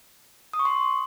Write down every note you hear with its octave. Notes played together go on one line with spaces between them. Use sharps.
D#6
C#6
C6